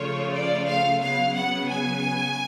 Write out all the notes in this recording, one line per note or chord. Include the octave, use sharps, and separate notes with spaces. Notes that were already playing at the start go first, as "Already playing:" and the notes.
Already playing: C#3 F3 A3 F4 C#5
D5
F5
C#3 F#3 B3 F5
F#5
G#5